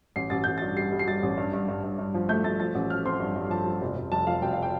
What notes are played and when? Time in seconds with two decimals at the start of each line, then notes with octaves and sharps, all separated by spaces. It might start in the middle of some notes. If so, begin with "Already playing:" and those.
0.16 A1 C7
0.30 A1 A6
0.44 A1 G6
0.58 A6
0.62 G2
0.77 G3 C7
0.92 G3
0.99 C7
1.08 G3 A6
1.23 A1
1.37 G2
1.53 G2
1.68 G2
1.83 G2
1.99 G2
2.14 F3
2.29 A3 G6
2.44 A3 A6
2.60 F3 A6
2.75 A1
2.90 F3 F6
3.05 C4 C6
3.20 G2
3.36 G2
3.50 F3 A5
3.66 F3
3.82 F1
3.97 F1
4.12 F1 A5
4.27 F3 F5
4.42 F1 G5
4.53 F5
4.63 G5